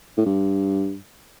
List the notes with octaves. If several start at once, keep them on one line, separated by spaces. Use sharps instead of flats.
A2
G2